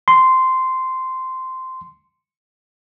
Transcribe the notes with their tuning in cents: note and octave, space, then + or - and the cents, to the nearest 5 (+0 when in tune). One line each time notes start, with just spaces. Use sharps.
C6 -10